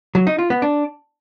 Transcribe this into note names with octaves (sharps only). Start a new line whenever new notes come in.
F#3
D#4
F4
B3
D4